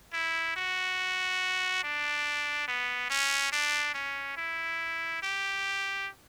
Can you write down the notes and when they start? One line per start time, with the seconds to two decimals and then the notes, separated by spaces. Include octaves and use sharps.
0.14 E4
0.56 F#4
1.83 D4
2.68 B3
3.10 C#4
3.52 D4
3.94 C#4
4.37 E4
5.22 G4